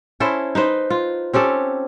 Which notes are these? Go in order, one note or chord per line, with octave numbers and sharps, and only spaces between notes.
C#4 E4 A4 C5
D#4 B4 C5
F4
C4 C#4 G4 A4